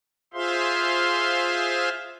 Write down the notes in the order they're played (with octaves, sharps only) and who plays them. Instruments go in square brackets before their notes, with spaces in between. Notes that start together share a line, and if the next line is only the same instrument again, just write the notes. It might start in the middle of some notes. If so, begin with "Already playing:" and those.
[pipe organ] F4 G#4 C5 E5 F5 C6